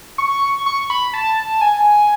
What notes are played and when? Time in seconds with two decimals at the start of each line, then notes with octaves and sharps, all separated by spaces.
0.18 C#6
0.66 C#6
0.90 B5
1.14 A5
1.61 G#5